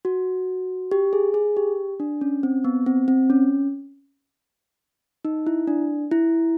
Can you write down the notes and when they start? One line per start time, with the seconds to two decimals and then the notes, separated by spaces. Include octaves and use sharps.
0.05 F#4
0.91 G4
1.13 G#4
1.34 G#4
1.57 G4
2.00 D4
2.21 C#4
2.43 C4
2.64 B3
2.86 C4
3.08 C4
3.30 C#4
5.25 D#4
5.47 E4
5.67 D4
6.11 E4